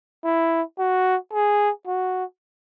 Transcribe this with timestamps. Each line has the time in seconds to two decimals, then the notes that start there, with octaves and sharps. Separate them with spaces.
0.24 E4
0.79 F#4
1.33 G#4
1.87 F#4